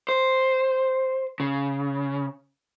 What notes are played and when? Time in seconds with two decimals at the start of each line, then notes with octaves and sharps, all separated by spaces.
0.09 C5
1.40 C#3